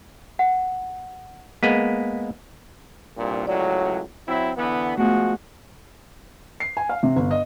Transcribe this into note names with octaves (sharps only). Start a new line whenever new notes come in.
F#5
G#3 A#3 B3 B6 D#7
C2 G2 A#2
C#2 A2 F#3 D5
F#3 C4 E4
D3 E3 B3
F3 G#3 A3 B3 F#4
C7
G#5
F5
C3
G1
D#5